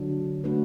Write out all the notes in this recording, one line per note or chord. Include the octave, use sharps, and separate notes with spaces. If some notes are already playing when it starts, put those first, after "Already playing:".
Already playing: D3 F#3 D4
A3 D4 F#4 B4